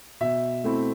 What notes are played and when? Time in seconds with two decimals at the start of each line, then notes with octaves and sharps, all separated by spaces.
0.21 B2 E5
0.64 A3 C4 E4